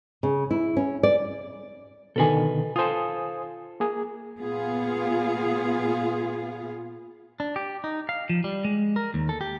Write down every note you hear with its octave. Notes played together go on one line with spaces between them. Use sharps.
C#3
E4
C#4
D5
B2 D3 D#3 A4 B4 G#5
F4 A4 C5 G#5 D#6
A#3 G#4
A#2 B3 F4 G#4 F5
D4
G4
D#4
F5
F3
G3
G#3
A#4
D#2
A4
G4